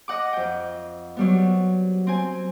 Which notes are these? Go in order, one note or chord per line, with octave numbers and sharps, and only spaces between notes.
D#5 F#5 D6
F2 G5
F#3 G3 B3
C4 G#5